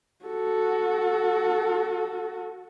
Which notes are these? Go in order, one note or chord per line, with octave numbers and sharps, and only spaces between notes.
F#4 A4